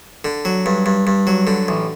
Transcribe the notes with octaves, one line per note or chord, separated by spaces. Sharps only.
D3
F#3
G2
G2
G2
F#3
D3
A1